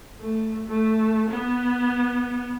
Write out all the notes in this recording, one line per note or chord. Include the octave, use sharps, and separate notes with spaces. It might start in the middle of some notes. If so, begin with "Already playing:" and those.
A3
A3
B3